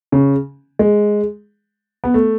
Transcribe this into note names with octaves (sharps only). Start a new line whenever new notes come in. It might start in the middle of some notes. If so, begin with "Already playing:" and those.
C#3
G#3
B3
A3